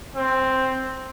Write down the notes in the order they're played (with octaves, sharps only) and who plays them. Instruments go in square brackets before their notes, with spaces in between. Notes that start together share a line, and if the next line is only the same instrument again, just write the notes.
[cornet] C4